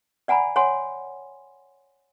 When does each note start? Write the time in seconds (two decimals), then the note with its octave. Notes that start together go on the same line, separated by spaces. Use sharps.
0.28 D5 F#5 G#5 A#5 B5
0.56 C#5 F#5 G#5 C6